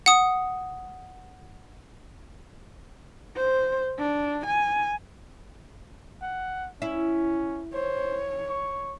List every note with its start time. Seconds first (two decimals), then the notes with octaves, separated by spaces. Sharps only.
0.06 F#5 D#6
3.37 C5
3.99 D4
4.46 G#5
6.22 F#5
6.82 C#4 E4
7.74 C5 C#5
8.49 C#6